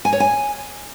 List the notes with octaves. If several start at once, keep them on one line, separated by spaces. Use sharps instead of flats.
G#5
C#5
G#5